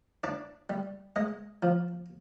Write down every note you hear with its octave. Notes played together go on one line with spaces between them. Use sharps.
D4 D5
G3
G#3 D#5
F3